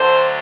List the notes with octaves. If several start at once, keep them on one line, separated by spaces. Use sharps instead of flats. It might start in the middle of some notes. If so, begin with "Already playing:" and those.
Already playing: D2 D3 F#3 C5